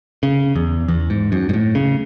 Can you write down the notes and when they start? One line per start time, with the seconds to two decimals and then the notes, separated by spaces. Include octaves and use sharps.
0.23 C#3
0.56 E2
0.88 E2
1.10 G#2
1.32 F#2
1.49 G#2
1.53 A2
1.75 C#3